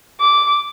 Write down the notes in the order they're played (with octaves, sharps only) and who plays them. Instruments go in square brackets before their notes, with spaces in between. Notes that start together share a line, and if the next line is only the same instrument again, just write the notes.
[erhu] D6